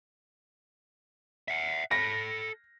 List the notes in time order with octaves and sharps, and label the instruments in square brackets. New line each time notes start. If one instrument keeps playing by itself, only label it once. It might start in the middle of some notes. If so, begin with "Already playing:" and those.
[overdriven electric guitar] E5 F#5
[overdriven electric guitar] A4 B5 [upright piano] A#6